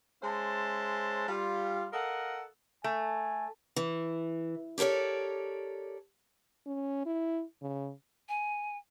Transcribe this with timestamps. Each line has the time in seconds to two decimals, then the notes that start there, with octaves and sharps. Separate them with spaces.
0.22 G#3 C#4 C5 E5 A5
1.28 G3 F4
1.93 A4 A#4 D#5 F5 F#5
2.84 A3 G#5
3.76 E3
4.78 G4 A4 A#4 C#5 D5
6.67 C#4
7.06 E4
7.62 C#3
8.29 G#5